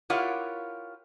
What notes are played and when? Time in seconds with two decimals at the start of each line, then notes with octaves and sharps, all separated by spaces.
0.10 E4 F4 G4 A#4 C#5 F#5